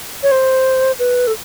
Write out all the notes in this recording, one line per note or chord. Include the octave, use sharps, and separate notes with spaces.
C#5
C5
B4
A4